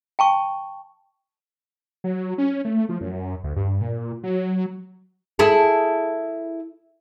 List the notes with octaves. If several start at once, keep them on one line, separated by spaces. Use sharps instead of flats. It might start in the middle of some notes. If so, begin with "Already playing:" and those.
G5 A5 C#6
F#3
C#4
A3
F3
F#2
D2
G2
A#2
F#3
E4 G#4 A4